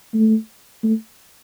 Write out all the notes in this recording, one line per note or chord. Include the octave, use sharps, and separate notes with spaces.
A3
A3